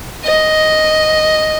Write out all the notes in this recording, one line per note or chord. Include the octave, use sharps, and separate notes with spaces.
D#5